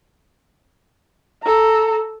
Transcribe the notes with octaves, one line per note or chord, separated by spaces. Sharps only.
A4 A#5